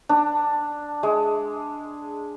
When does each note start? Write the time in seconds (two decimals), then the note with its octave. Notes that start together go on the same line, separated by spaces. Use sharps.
0.09 D4
1.03 G#3